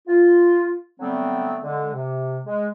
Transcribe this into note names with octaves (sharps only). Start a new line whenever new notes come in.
F4
D3 F#3 G3 A3 B3 C4
D3 G#3
C3
G#3